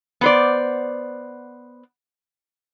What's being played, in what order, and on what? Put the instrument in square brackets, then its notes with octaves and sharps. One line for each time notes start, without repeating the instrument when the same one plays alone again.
[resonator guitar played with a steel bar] B3 C5 D5